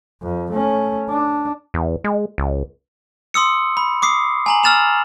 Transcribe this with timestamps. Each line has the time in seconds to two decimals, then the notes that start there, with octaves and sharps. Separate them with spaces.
0.23 F2
0.53 A3 C#4
1.10 D4
1.74 E2
2.04 G#3
2.38 C#2
3.34 C6 D#6 E6 C#7
3.77 B5
4.02 D6 D#6 C7
4.46 G#5 A#5 F#7
4.63 E6 F6 A6 E7 F7